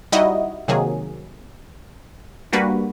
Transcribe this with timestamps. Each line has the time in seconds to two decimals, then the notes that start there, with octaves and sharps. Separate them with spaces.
0.12 G3 D#4 E4 F#4 D#5
0.68 C3 D#3 F#3 A#3 G#4
2.53 G3 A#3 D4 F#4 B4